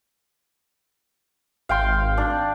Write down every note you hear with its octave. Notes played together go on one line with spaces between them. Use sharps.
G#1 F5 G5 C6
D4